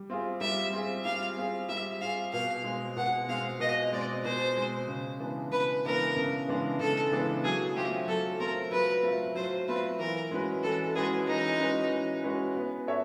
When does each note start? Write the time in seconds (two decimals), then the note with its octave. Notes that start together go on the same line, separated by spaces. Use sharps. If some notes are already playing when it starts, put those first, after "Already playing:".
Already playing: G3
0.10 C4 F4 G#4
0.41 G3 E5
0.73 C4 F4 G#4
1.04 G3 F5
1.37 C4 F4 G#4
1.69 G3 E5
2.01 C4 F4 G#4 F5
2.33 B2 F5
2.64 G#3 C4
2.96 B2 F#5
3.28 G#3 C4 F5
3.60 B2 D#5
3.92 G#3 C4 D5
4.24 B2 C5
4.56 G#3 C4
4.88 C#3
5.20 E3 G#3 B3 D4
5.52 C#3 B4
5.84 E3 G#3 B3 D4 A#4
6.16 C#3
6.48 E3 G#3 B3 D4
6.80 C#3 A4
7.12 E3 G#3 B3 D4
7.44 F#3 G#4
7.76 A3 C4 F4 G4
8.08 F#3 A4
8.40 A3 C4 F4 A#4
8.71 F#3 B4
9.03 A3 C4 F4
9.35 F#3 C5
9.68 A3 C4 F4 B4
9.99 E3 A#4
10.31 G#3 C#4 F#4 B4
10.63 E3 A4
10.95 G#3 C#4 F#4 G#4 B4
11.28 E3 D#4
11.60 G#3 C#4 F#4 B4
11.91 E3
12.23 G#3 C#4 F#4 B4
12.55 B3
12.87 E4 A4 C#5 E5